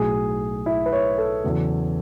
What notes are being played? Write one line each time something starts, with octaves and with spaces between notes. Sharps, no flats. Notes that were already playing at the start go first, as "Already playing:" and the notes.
Already playing: B1 A2 F#3 G#4
E4
B4
C#5
A4
E2 C#3 F#3